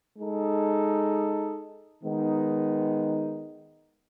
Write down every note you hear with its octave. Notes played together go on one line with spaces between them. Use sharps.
G#3 D#4 A4
D#3 G#3 B3 D#4